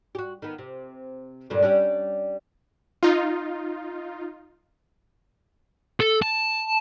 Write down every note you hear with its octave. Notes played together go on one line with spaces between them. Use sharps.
F#4 G4
D#3 B3
C3
G2 A#2 D3
G3 C#4 D4
D#4 F4
A4
A5